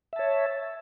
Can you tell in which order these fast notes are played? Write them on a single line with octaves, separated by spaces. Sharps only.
E5 A5 C#5